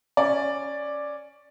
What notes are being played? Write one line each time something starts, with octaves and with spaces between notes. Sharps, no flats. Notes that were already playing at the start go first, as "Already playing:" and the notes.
C#4 D5